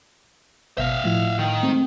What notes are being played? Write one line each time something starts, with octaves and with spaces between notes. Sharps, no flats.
G#1 B2 E5 F5
A2 F3 E4
D#3
G#3 A3 C4